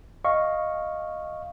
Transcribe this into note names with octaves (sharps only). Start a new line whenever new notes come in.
D#5 F5 C#6